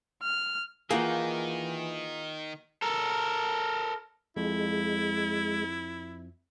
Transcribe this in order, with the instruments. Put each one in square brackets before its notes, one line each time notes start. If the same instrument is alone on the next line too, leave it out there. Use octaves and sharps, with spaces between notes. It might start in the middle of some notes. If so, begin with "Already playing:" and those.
[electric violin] F6
[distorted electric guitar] D#3 [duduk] E3 [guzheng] A#3 F#4 G5 [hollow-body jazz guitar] F4 G#4
[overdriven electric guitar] A4 A#4
[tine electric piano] F2 [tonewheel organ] G#3 [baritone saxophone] E4